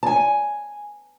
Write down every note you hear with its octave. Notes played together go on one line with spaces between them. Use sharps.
G#5 A5